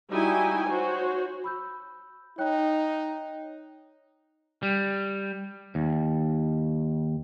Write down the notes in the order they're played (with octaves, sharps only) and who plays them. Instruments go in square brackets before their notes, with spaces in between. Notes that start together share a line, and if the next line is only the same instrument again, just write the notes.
[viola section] G3 D#4 E4 F#4 G5 G#5
F#4 C5 C#5
[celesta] B5 E6 G6
[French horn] D#4 [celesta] C#5 G5 F#6
[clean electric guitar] G3
D#2